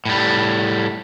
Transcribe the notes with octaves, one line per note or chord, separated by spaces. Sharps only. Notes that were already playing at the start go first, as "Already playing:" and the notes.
A2 G3